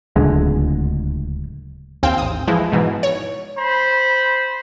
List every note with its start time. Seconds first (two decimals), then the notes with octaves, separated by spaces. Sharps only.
0.16 D1 C#2 D3 G#3
2.03 D#2 C4 F5 G5
2.18 A1 D#6
2.48 E3 F3 G#3 E4
2.72 G#2 B2 E3
3.03 C#5
3.57 C5 B5